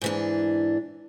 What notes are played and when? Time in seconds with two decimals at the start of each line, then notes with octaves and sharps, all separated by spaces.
0.02 G#2 E3 D4